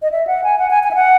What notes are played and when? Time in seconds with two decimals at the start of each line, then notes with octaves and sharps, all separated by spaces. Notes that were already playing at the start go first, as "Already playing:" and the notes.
0.02 D#5
0.11 E5
0.27 F#5
0.44 G#5
0.59 F#5
0.71 G#5
0.83 G#5
0.91 E5
0.95 F#5